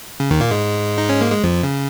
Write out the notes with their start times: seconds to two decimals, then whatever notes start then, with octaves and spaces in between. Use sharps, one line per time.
0.20 C#3
0.31 D#2 D#3
0.41 A#2 A#3
0.51 G#2 G#3
0.98 D#4
1.09 C#4
1.21 A#3
1.31 G#3
1.44 F2 F3
1.63 C#3